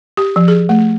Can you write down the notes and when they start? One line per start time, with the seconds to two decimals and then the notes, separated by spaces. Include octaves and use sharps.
0.17 G4
0.36 F3
0.48 G#4
0.69 A3